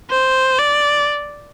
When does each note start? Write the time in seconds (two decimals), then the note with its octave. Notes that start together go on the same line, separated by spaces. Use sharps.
0.11 C5
0.59 D5